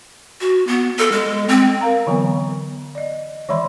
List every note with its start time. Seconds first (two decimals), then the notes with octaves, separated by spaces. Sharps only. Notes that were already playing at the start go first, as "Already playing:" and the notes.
0.41 F#4
0.67 B3
0.98 A4
1.12 G#3
1.49 C4
1.81 A#4 F5 A#5
2.07 D3 E3 F#3 B3
2.95 D5 D#5
3.49 D#3 E3 G#3 D5 B5 C6